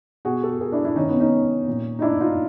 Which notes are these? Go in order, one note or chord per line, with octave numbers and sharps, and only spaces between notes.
B2 F#4 G#4
G4 A4
G#4 A#4
D4 E4
D4 E4
C3 D#3 C#4 D#4
B3 C#4
C#4 D#4
A#2 F3
D#4
D4 E4
D#4 F4